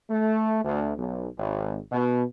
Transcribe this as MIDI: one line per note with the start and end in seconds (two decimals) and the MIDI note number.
0.10 0.63 57
0.64 0.93 38
0.96 1.27 35
1.37 1.77 32
1.90 2.23 47